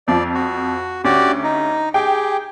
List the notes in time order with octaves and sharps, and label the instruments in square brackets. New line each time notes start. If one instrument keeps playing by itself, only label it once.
[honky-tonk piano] F2 F3 [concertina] D5
[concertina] F#4
[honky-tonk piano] D2 C#4 [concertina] F#4 G4 D5
[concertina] D#4
[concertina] G4 G#4 [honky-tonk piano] G5